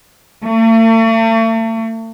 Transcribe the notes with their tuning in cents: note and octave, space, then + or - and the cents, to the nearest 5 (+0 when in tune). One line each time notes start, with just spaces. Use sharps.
A3 +40